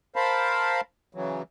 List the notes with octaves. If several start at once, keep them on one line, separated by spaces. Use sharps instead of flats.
A#4 C5 F5 A5 B5
C#3 E3 F#3